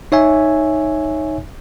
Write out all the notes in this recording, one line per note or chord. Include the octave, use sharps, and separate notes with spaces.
D#4 C#5 E5 G#5